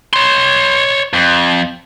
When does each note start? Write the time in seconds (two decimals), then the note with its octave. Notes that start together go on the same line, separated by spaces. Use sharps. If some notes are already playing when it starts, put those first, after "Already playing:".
0.13 C#5 C6
1.13 F2